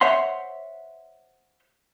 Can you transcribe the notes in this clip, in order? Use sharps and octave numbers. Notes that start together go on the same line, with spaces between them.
C5 C#5 E5 F#5 C6